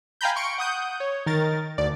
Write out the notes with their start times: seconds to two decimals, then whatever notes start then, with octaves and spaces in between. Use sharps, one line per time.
0.21 F5 G5 G#5 A#5 B5 G6
0.36 C6 C#6 C#7 D7
0.58 F#5 D#6 G6
1.00 C#5
1.26 D#3 A#4 A6
1.78 D2 D5